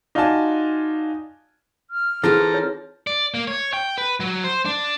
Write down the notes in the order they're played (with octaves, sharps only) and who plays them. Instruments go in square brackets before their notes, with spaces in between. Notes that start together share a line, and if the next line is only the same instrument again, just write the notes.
[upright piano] D#4 F4 F#4 D5 G#5 A5
[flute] F6
[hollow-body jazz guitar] E3 C4 F4 [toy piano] G#4 [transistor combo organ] A4 A#5
[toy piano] D#4 C#5
[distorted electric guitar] D5
A#3
C#5
G5
B4
F#3
C5
D4